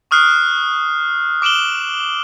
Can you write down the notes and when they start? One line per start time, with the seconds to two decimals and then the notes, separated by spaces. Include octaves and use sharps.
0.11 C#6 D#6 F6 F#6 C7
1.42 D6 D7 E7 F#7 G7